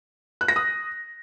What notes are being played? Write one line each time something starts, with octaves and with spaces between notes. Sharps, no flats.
F#6
A#6
D#6